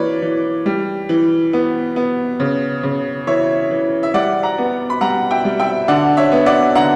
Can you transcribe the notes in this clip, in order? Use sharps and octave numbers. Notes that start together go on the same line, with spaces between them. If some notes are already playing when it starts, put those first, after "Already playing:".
Already playing: E3 A#3 B4 C#5 D5
E3
G3
E3
B3
B3
C#3
C#3
E3 C#5 E5
E3
E5
G3 D5 F#5
F#5 A#5
B3
B5
G3 F#5 A#5
E5 G5
G3
E5 G5
D3 D5 F#5
C#5 E5
B3
D5 F#5
D3 F#5 A#5